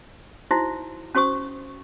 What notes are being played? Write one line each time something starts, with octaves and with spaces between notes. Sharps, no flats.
D#4 E4 F#4 C5 E5
C#4 F#4 C5 C#6 D#6